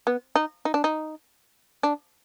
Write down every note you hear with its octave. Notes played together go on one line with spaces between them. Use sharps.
B3
D#4
D#4
D4
D#4
D4